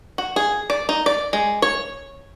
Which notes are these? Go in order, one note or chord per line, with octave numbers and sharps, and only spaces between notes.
F#4
G#4
D5
D#4
D5
G#3
C#5